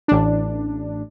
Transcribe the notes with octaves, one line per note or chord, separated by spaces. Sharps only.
A1 D4